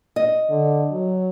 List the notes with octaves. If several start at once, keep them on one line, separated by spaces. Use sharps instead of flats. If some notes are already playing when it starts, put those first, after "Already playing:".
D#5
D3
F#3